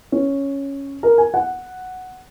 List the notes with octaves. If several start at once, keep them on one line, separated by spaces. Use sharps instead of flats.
C#4
A#4
G#5
F#5